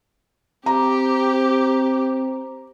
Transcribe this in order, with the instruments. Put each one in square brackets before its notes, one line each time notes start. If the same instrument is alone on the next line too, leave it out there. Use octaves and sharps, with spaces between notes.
[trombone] C4 [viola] G4 [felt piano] A#5